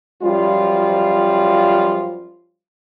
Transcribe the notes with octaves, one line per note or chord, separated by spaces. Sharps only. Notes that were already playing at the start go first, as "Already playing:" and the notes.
F#2 F3 G3 F4